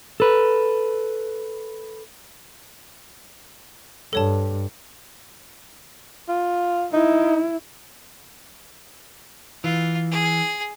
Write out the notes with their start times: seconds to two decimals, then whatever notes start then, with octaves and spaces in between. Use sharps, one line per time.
0.20 A4 B4
4.13 G2 A4 C#5 A5
6.29 F4
6.93 D#4 E4
9.64 E3 F4
10.11 G#4